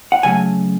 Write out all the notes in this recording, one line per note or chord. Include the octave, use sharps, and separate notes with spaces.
F#5
C#3 F#3 A3 G#5